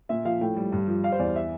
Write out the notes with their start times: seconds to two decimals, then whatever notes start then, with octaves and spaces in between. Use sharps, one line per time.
0.09 A#2 E5
0.25 F3 F5
0.41 A2 G5
0.56 G3
0.72 G2
0.88 F3
1.03 G3 F5
1.12 C5
1.19 E2 D5
1.36 E5